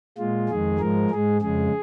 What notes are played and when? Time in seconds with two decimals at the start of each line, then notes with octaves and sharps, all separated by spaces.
0.18 A#2 G#3 F4
0.48 F2 D#3 G#3 G#4
0.79 G#2 F3 G#3 A#4
1.10 G#2 G#3 G#4
1.41 F2 C#3 G#3 G#4